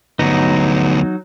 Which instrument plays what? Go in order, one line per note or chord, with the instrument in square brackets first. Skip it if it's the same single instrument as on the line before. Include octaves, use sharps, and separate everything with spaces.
[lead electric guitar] D2 B3 [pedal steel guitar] F#3 D#4